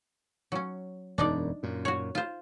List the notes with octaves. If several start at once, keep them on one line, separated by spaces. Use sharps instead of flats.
F#3 C#4
E1 F#2 D4 D#4 D5
F#2 A#2
F#4 C#5
F4 C5